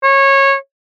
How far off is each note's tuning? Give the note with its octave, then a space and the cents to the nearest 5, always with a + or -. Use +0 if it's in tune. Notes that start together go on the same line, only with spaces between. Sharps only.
C#5 -20